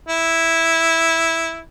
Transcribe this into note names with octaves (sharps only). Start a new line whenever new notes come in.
E4